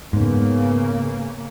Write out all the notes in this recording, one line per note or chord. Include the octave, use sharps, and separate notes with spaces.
G#2 C#3 A#3 B3